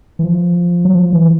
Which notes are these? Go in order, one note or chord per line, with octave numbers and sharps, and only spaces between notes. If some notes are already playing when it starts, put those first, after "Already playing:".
E3
F3
F#3
F3
E3